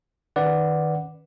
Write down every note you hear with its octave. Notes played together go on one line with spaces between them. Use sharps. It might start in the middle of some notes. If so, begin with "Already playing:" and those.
D#3 C#4 B4 D5 F#5